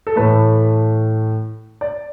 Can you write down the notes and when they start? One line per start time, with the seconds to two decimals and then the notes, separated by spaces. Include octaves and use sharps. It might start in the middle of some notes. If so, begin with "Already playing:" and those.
0.07 A4
0.16 A2 E3 A3 B4
1.81 D5